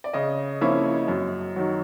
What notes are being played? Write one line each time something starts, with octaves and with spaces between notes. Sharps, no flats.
D5
C#3 D#5
F3 A#3 C#4 E4
F#2
D#3 F#3